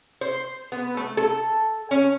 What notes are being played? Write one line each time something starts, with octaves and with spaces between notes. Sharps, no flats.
C5
B3
A3
A4
C#4